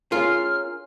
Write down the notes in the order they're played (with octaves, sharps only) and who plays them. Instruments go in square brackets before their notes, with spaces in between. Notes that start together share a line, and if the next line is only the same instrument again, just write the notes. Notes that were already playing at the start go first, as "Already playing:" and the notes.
[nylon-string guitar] C#4 G#4 A#4 [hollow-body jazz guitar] F4 [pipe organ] F6